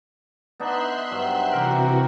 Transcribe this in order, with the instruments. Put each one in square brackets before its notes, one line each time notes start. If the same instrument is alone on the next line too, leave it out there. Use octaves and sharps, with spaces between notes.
[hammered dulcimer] B3 D4 D#4 [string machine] E5 C6 F#6
[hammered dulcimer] G2 F#3 C5
[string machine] C3 E3 F#4 [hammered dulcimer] G4 A#4